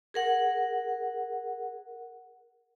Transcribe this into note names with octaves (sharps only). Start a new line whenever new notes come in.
G#4 A#4 F#5